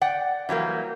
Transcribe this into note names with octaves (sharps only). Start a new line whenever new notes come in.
D5 F#5 G5
E3 F#3 G3 A#3